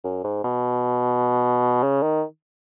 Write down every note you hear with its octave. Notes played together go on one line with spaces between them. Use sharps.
F#2
G#2
B2
C#3
D#3